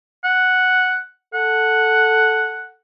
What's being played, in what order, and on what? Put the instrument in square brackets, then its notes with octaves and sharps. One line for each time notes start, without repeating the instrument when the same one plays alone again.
[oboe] F#5
[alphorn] A4 [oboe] F#5